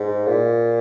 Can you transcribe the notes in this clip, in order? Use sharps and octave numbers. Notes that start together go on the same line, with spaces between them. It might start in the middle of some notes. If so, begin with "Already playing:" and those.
Already playing: G#2
A#2